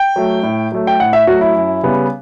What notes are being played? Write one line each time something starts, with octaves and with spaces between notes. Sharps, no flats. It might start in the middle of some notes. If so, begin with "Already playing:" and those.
Already playing: G5
F#3 A3
A2
F#3 A3
G5
A2 F#5
E5
F#3 A3 F#4
E4
F#2
C#3 G3 B3